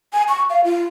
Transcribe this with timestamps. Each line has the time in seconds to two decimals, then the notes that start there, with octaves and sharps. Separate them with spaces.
0.13 G#5
0.28 C#6
0.50 F5
0.64 F4